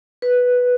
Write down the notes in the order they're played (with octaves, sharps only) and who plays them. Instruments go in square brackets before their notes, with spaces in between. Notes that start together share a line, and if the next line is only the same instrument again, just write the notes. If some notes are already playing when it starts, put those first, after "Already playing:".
[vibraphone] B4